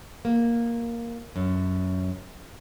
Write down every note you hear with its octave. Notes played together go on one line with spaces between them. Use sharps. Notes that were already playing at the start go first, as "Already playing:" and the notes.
A#3
F#2